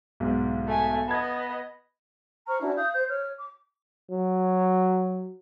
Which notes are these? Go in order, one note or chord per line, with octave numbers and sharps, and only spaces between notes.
B1 G#2
A3 G#5
B3 D#5 A5 G#6
C5 A#5 C#6 F6
C#4 D4 E4 F#4
F5 D#6 G6
C5 G6
C#5 F6
D6
F#3